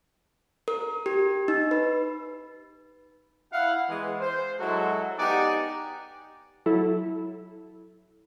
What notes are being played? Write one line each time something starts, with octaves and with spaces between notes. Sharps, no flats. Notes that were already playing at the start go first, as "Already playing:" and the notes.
A#4
G4
D#4
B4
E4 F5 F#5
E3 G#3 B3
C5
F#3 G#3 E4 F#4 A4
B3 D#4 G4 D5 F#5 G#5
F#3 E4 A4